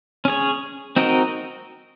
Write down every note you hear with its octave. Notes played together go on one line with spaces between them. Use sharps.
C#4 G#4 C#5
C4 D#4 F#4 A#4 D#5